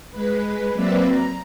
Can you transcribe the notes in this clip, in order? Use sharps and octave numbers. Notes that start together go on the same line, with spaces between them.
G#3 B4
F#3 A#3 C4 B4 D5 E5
A#5